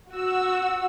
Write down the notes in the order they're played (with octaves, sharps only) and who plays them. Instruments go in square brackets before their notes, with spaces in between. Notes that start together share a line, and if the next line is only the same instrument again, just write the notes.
[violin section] F#4 E6